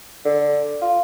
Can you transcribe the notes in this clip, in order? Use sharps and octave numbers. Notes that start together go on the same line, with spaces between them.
D3
F4